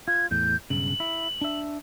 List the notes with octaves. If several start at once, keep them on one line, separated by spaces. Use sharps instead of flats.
F4 G#6
E2 A2 G6
B1 G2 C#3 F#7
E4
D4 E5